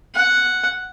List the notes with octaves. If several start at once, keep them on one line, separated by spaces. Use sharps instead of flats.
F#5